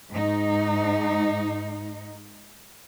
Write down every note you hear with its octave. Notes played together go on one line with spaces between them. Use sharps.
G#2 D#4